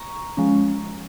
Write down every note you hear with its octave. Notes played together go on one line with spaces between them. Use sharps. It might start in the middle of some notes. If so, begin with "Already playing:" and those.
Already playing: A#5 C#6
F3 G#3 C#4